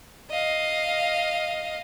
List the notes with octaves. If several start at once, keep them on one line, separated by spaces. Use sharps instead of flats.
D#5 F5